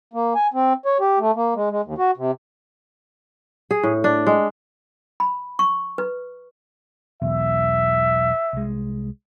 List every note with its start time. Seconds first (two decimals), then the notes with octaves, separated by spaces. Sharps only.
0.13 A#3
0.35 G#5
0.54 C4
0.86 C#5
1.00 G4
1.19 A3
1.35 A#3
1.55 G#3
1.70 G#3
1.84 D#2
1.98 F#4
2.17 C3
3.71 G#4
3.83 A2
4.04 D4
4.27 G#3
5.20 B5
5.59 C#6
5.98 B4
7.22 E1 B1 E2 E5
8.53 C2 G#3